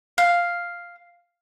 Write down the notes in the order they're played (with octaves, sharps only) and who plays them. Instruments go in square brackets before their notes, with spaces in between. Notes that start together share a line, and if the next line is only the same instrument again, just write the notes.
[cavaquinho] F5